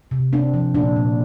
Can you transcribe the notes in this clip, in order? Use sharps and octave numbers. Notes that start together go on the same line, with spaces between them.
C3
C4 D4
F3
A#2 D4
A#2